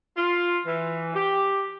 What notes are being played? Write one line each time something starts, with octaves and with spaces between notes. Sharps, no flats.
F4
E3
G4